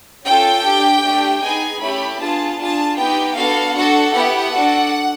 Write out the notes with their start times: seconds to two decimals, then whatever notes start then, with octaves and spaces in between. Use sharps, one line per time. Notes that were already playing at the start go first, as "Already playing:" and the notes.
0.24 C#4 F4 A4 G5
0.64 D4 G4
1.03 A3 D4 G4
1.42 B3 D#4 G#4 G#5
1.81 A3 C#4 E4 G4 B5
2.19 B3 D4 F4 G#4 A5
2.58 D4 F4 G#4 A5
2.97 B3 D#4 G4 G5
3.36 B3 D4 F#4 A4 F5
3.75 D4 F#4 A4 F#5
4.14 B3 E4 G4 F#5
4.53 D4 F#4 A4